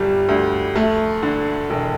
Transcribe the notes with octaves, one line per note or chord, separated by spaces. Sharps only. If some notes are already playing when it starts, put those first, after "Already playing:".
Already playing: G1 G3
D2
A3
D3
E1